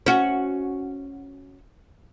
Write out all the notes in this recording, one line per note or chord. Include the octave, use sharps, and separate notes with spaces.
C#4 F#4